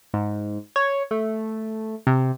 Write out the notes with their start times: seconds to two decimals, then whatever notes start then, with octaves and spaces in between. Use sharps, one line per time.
0.14 G#2
0.76 C#5
1.11 A3
2.07 C3